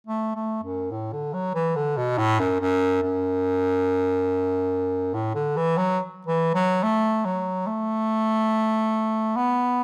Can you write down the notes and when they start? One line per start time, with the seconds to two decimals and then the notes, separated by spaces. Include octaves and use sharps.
0.07 A3
0.35 A3
0.63 F#2
0.91 A2
1.12 D3
1.33 F#3
1.54 E3
1.76 D3
1.97 B2
2.18 A2
2.39 F#2
2.60 F#2
3.02 F#2
5.14 A2
5.35 D3
5.56 E3
5.77 F#3
6.26 E3
6.54 F#3
6.83 A3
7.25 F#3
7.67 A3
9.36 B3